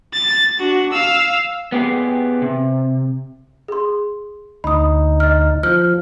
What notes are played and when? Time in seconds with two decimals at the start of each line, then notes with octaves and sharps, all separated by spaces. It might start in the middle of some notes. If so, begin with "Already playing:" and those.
0.13 A6
0.59 D4 F#4
0.92 F5 E6
1.72 B3 G4 G#4
2.42 C3
3.68 G#4 C6
4.64 D2 D#4 B5 D#6
5.20 D#5 F6
5.63 F3 F6 G6